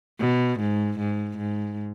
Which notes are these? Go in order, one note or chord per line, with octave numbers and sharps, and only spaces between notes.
B2
G#2
G#2
G#2